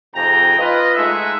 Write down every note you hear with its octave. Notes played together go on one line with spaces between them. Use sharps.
F2 G#2 C3 G5 G#5 A#5
F4 B4 D#5
G#3 A3 D#4 G#4 E5 F#5